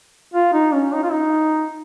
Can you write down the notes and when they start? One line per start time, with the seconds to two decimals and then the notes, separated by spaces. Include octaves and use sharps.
0.34 F4
0.53 D#4
0.73 C#4
0.94 D#4
1.03 F4
1.12 D#4